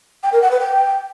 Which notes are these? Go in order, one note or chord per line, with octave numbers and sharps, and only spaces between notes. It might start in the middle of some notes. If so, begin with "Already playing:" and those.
G5
A#4
F#5
B4
G5